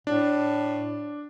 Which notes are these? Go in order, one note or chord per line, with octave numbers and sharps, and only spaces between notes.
A2 D4